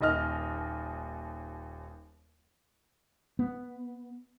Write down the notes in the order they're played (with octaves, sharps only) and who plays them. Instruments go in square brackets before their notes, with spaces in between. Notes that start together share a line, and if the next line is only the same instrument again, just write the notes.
[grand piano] D#1 D#2 D#5 F6
[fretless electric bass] B3